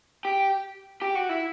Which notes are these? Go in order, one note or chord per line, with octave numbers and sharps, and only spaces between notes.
G4
G4
F#4
E4